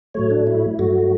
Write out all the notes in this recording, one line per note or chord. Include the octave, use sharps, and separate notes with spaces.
A2 F#3 A3 C#5
D4
E4
G2 F#3 A3 F#4